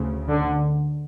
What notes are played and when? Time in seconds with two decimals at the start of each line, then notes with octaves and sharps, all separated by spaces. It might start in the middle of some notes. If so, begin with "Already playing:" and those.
Already playing: D2 C#3
0.29 D3